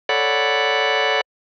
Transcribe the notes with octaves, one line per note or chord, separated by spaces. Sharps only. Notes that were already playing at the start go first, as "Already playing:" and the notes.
A4 C#5 D5 F#5 B5